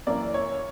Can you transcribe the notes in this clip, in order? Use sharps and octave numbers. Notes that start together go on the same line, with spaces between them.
F#2 E3 A#3 D5
C#5